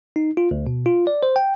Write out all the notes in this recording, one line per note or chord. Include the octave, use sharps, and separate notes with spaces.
D#4
F4
D2
B2
F4
D5
C5
G5